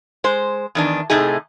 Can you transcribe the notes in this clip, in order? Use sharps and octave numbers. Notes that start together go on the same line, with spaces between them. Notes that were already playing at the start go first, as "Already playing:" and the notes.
G#3 C5
E2 D#3 D4
A2 C3 A3 D#4 G#4